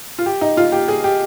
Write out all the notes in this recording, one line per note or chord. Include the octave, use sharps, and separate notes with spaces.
F4
G4
D#4
F4
G4
G#4
G4